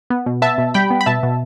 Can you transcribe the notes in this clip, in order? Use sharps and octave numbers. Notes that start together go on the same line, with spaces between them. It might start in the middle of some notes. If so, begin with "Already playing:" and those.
B3
B2
B3 E5 A5
B2
G3 G5 B5
B3
B5
B2 E5 A5
B2